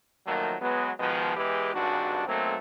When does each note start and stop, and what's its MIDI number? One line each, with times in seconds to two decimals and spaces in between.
0.27 0.56 51
0.27 0.56 53
0.27 0.56 54
0.27 0.56 57
0.27 0.56 58
0.62 0.91 54
0.62 0.91 56
0.62 0.91 59
1.00 1.36 47
1.00 1.36 51
1.00 1.36 53
1.00 1.36 56
1.00 1.36 59
1.36 1.74 40
1.36 1.74 52
1.36 1.74 56
1.36 1.74 67
1.36 1.74 71
1.74 2.26 32
1.74 2.26 37
1.74 2.26 43
1.74 2.26 62
1.74 2.26 66
2.27 2.57 35
2.27 2.57 54
2.27 2.57 57
2.27 2.57 58
2.27 2.57 60